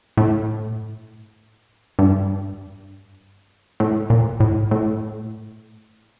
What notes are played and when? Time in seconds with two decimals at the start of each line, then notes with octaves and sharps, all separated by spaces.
0.17 A2
1.99 G2
3.80 A2
4.10 A#2
4.40 A2
4.71 A2